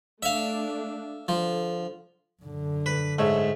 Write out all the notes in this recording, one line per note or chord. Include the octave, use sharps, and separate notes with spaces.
A3 D4 E5 F5
D3 F3
F#2 D3
B4
G#2 A3 C#5 E5